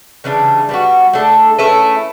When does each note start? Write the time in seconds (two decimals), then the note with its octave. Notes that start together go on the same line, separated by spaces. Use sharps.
0.24 C#3 E3 G3 D4
0.69 G3 B3 F#4
1.13 A3 D4 A4
1.58 A3 C#4 E4 B4